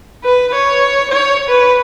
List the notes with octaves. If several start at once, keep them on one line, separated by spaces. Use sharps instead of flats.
B4
C#5
C#5
B4